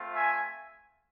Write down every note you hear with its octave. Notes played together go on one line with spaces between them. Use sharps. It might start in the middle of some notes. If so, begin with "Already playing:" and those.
Already playing: A3 C4 F4
E5 G#5